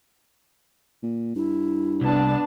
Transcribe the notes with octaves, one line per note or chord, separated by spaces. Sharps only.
A#2
G2 E4
C2 B3 D4 A5